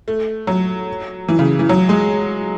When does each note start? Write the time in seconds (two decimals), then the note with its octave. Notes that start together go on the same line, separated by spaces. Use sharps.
0.08 A3
0.47 F#3
1.28 E3
1.39 C#3
1.59 E3
1.69 F#3
1.89 G#3